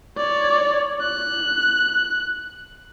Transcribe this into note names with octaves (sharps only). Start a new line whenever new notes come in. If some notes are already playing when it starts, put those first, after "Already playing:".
C#5 D5
F#6